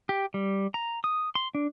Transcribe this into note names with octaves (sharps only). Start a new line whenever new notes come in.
G4
G3
A#5
D#6
C6
D4